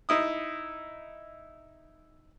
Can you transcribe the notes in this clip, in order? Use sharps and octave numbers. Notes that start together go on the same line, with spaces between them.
D#4 E4 D#6